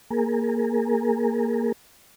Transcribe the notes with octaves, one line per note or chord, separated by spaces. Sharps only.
A#3 G#4 A#4